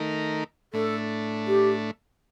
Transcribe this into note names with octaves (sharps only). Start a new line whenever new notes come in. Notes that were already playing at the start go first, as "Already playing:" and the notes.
Already playing: D#3 A3 D#4 A#4
A2 A3 D4 A4
G4